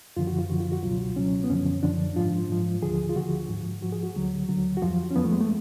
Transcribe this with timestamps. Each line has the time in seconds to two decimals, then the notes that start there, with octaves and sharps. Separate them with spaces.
0.17 F#2 D3 F3 F4
0.27 F#4
0.39 F4
0.50 F#2 D3 F3 F#4
0.60 F4
0.72 F#4
0.83 C#2 B2 F#3 F4
1.16 C#2 B2 F#3 C#4
1.44 B3
1.50 F#2 D3 F3 C#4
1.83 F#2 D3 F3 D4
2.16 G#2 F3 F4
2.50 G#2 F3
2.83 D2 D3 F3 G#4
3.09 F4
3.16 D2 D3 F3 F#4
3.49 G#2 F3
3.82 G#2 F3 F#4
3.92 G#4
4.03 F#4
4.16 D2 D3 F#3
4.49 D2 D3 F#3
4.77 F#4
4.82 F2 F3 F4
5.11 C#4
5.16 F2 F3 B3
5.24 A3
5.32 G#3
5.41 A3